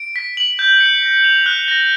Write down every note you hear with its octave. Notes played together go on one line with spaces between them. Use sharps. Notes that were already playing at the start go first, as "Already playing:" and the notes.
Already playing: D7
B6
F#7
G6
C#7
A#6
F7
F#6
A#6